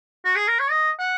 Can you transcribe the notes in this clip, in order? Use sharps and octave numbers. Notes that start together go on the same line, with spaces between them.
F#4
G#4
A#4
C#5
D#5
F#5